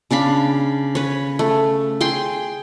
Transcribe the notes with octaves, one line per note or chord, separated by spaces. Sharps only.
C#3 D4 F5 B5
B4 C#5
A3
G#4 G5 C6